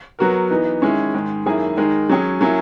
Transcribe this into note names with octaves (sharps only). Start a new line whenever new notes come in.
F#3 B3 F#4 A#4
E3 B3 D#4
D#3 G#3 C#4 E4
G#2 D#3 G#3
F#2 D#3 A#3 E4 G#4
D#3 G#3 D#4 A#4
F#3 C#4 G#4
F#3 A#3 C#4 E4